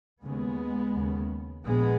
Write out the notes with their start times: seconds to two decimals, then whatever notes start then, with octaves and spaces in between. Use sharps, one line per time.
0.22 D#2 C#3 G#3 B3
0.94 D#2 C#3
1.66 A#1 G#3 B3